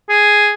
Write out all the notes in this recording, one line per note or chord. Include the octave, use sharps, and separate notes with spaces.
G#4